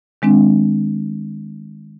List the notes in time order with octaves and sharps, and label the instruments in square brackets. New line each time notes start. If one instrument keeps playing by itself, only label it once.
[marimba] D#3 G#3 C4 D4